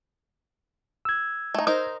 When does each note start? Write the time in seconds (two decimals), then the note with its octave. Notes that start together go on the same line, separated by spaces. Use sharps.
1.05 E6 G#6
1.54 A3 D#4
1.67 D#4 A#4 C5